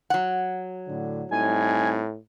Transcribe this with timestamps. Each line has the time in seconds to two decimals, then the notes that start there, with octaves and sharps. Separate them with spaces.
0.10 F#3 F#5
0.88 A2 D3
1.31 A2 G3 C4 D#4 G#5